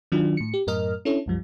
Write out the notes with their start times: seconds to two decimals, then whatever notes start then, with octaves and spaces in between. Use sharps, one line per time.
0.12 D#3 F#3 D4 F4
0.37 A2 C#7
0.54 G4
0.67 F#2 A2 A#4 D#5 F6
1.05 C#4 D4 E4 A4 C#5
1.26 C2 F#2 F3 G3